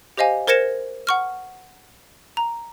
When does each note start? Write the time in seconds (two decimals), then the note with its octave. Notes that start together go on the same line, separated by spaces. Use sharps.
0.17 G4 C5 D#5 F5 G#5
0.47 A#4 C5 G#6 A#6 C#7 E7
1.07 F#5 C#6 F6
2.37 A#5